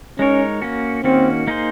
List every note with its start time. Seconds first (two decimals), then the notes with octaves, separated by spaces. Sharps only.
0.19 G#3 C#4 D#4 A#4 C#5
0.62 A#3 C#4 F#4
1.04 D#3 A#3 C4 C#4 F#4
1.47 A#3 D#4 G#4 C5